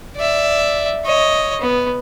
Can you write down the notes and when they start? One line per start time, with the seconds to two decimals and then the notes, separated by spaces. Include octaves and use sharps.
0.16 D5 E5
1.05 C#5 D#5
1.61 B3